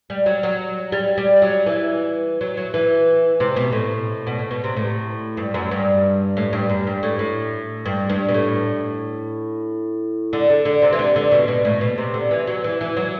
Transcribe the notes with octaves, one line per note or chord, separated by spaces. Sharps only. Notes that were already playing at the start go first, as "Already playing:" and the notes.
G3
F#3
F#3
G3
G3
F#3
E3
F#3
F#3
E3
C3
B2
A2
B2
A2
B2
C3
A2
G2
F#2
G2
A2
G2
F#2
G2
A2
A2
G2
G2
B2
A2
D3
D3
D3
C3
E3
D3
D3
B2
B2
A2
B2
C3
D3
E3
F#3
E3
E3
F#3